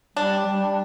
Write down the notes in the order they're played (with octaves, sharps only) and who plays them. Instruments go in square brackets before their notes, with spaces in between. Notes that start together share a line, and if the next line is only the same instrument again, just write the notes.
[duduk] G3 [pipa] D4
[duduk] G3